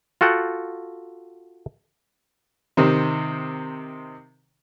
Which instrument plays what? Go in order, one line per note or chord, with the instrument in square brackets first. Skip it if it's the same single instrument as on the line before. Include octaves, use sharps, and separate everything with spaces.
[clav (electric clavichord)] F4 F#4 A4 F#5 G5
[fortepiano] C3 D#3 C4